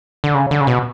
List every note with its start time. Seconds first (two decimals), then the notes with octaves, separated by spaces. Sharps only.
0.24 D3
0.35 C#3
0.51 D3
0.61 C#3
0.67 B2